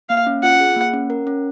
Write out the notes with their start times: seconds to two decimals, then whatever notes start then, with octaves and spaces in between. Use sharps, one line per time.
0.10 A#3 F5
0.27 C#4
0.43 F4 F#5
0.60 G#4
0.76 A#3
0.94 C#4
1.10 A#4
1.27 C#4